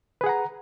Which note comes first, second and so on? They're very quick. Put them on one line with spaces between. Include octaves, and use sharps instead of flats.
B4 G#4 F#5 A#5